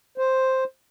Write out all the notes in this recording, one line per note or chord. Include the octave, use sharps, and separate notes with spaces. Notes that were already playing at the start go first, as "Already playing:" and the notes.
C5